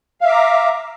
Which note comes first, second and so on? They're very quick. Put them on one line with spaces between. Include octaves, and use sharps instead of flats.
F5 E5 D6 A#5